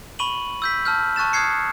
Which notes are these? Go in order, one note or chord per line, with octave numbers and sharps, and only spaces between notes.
B5 C#6 D#7 F#7
E6 G6 B6
A5 E6 F6 G6
A5 C#6 F#6 A6 E7
D#6 F6 F#6 G#6 C7 C#7